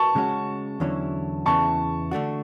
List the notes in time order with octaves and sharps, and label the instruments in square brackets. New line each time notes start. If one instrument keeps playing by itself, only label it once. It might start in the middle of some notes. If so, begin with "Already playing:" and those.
Already playing: [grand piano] A5 C#6
[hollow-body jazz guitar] C#3 G#3 C#4 F#4
E2 D3 F#3 C#4 E4
[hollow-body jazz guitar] E2 C#3 E3 [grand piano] A5 C#6
[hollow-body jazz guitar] D3 A3 D4 F#4